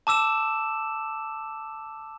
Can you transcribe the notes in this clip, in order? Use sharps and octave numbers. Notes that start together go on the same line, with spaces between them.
A5 D6 E6 E7